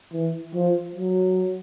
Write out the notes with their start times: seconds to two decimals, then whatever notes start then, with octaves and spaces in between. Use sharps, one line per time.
0.13 E3
0.55 F3
0.95 F#3